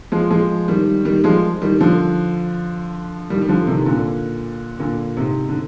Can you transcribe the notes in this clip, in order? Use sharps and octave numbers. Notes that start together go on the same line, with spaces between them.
F3 G#3
F3 G#3
D#3 G3
D#3 G3
F3 G#3
D#3 G3
D3 F3
D#3 G3
G3
D3 F3
C3 D#3
A#2 D3
A#2 D3
G#2 C3
D3